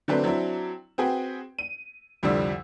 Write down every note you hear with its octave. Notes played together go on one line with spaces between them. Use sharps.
D3 F#3 A3 C4 D4 B4
F#3 C4 D4 E4
C4 F#4 G#4 B4 G5
D#7
C2 F2 D3 G3 D4 E6